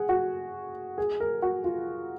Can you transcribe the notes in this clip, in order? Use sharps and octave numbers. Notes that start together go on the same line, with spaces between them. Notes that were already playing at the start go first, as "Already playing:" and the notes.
Already playing: G#4 F#5
F#4
G#4
A#4
F#4
F4